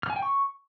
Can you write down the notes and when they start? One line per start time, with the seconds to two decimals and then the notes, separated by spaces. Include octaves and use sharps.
0.03 F6
0.10 G#5
0.16 G5
0.22 C#6